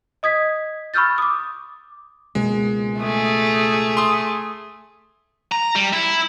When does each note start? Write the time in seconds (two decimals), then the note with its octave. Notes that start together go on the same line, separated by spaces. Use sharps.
0.23 D#5 D#6 G#6 B6
0.94 B5 C#6 E6 F6 G6 A6
1.18 D6 D#6
2.35 C#2 B2 G#3 A#3
3.00 A3 G#4
3.97 C6 D#6
5.52 A#5
5.75 G3
5.93 E4